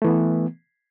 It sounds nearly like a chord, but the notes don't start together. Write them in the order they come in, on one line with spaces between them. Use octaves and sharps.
A3 E3 B3